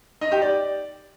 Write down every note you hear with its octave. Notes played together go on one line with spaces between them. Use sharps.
D#4
G4
D5